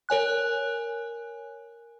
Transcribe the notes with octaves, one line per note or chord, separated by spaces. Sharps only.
A#4 C#5 G#5 F#6